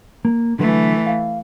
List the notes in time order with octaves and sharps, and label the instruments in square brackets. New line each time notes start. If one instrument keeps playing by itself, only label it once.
[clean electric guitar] A#3
[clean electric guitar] D3 F#3 B4 [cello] E3 A3
[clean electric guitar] F5